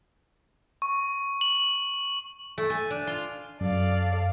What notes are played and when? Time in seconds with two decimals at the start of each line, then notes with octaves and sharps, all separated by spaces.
0.82 C#6
1.41 F#7
2.58 A3
2.70 G#5
2.90 D4
3.07 F4
3.61 F#2 A4 D5 F5